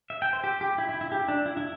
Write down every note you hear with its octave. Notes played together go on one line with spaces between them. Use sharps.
E5
G5
C5
G4
G4
E4
E4
E4
G4
D4
E4
E4